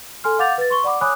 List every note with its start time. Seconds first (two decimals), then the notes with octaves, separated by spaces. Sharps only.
0.24 A4 G#5 C6 F6
0.39 F5 F#5 D6 G6 A6 F7
0.58 B4 A6
0.70 C6 C#6 G7
0.84 D5 F#5 B5 D6
1.01 C#5 G#5 B5 D6 D#6 F#6